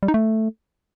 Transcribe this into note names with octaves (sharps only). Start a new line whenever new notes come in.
G3
D#4
A3